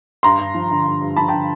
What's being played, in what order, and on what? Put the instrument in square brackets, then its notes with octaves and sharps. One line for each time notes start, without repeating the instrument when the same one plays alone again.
[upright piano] G2 A#5 C6
G2
F3
D3
G2
G2
F3 A5 B5
G5 A5
D3